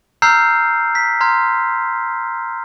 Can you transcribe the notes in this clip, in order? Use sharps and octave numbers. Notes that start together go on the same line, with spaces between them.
A#5 E6 F6 G6 C7
B6
A#5 C6 F6 G#6